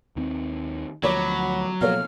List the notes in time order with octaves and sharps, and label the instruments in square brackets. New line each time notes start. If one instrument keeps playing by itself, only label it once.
[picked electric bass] D#2 D#3 C4
[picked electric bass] D2 F3 [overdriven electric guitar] F#3 [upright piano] C#5 D6 [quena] B5
[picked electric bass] B2 F3 A#3 [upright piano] A4 C#5 F5 [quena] F6